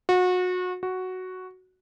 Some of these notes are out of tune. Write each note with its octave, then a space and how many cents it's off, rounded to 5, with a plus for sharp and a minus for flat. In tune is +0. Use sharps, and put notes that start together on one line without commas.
F#4 -30
F#4 +0